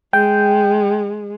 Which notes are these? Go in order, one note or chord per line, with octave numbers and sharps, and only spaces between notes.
G#3 G5